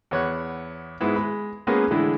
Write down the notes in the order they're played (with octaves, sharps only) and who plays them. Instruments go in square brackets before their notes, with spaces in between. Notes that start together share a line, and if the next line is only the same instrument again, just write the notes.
[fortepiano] E2 B3 C#5 C#6 F#6
G#2 G#3 B3 E4
G#3 B5
G#3 A#3 B3 C#4 F4 G#4
A2 D3 E3 G#3 E4